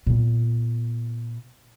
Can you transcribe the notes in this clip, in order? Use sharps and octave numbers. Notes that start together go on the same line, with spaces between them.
A#2 B3